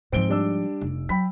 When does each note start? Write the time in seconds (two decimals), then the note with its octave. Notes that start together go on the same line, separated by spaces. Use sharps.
0.12 G#2 F3 C4 D7 G7
0.29 G3 D4 E6
0.81 F1
1.09 F#3 G5 B5 B6